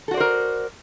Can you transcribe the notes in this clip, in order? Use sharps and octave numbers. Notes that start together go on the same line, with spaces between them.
F#4 A4 A#4 C5 D5